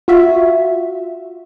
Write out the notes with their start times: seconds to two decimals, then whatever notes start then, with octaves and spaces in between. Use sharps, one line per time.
0.08 F4 F#4 E5